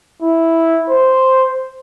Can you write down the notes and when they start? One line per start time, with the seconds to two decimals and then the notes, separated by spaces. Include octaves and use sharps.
0.22 E4
0.89 C5